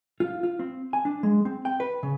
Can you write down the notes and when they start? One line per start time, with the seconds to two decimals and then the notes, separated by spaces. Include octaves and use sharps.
0.20 F4
0.43 F4
0.59 C4
0.93 G#5
1.05 D4
1.23 G#3
1.45 C4
1.65 G5
1.80 B4
2.03 C#3